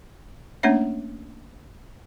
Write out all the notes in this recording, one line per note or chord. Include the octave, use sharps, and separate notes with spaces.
A3 A#3 C#4 D4 C#5 E5